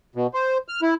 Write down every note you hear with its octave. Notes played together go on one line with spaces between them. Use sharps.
B2
C5
F6
E4